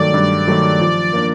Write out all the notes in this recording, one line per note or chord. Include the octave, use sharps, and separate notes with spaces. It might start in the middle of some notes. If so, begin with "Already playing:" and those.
Already playing: G2 D#3 F#3 A3 D5
G2
D#3 F#3 A3
F3
A#3 D4